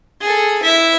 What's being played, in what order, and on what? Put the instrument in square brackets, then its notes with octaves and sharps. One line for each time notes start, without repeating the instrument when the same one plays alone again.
[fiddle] G#4 A4
E4 E5